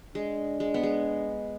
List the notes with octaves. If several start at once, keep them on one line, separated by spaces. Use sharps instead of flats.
G#3 D4
G#3
B3
G#3